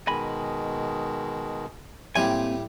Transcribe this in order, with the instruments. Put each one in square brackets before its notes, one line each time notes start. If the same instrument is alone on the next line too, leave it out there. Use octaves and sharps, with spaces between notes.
[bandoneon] B2 D#3 G#3 [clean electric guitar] D#5 G#5 B5
[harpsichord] A2 G3 [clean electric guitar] A#3 C4 G#5